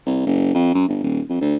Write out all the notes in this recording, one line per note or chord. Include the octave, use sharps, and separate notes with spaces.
C2
F#1
F2
F#2
G1
D#1
F2
D2